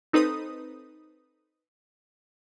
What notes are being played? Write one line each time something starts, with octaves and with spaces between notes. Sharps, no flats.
C4 D#4 A4 B4 C5 D#6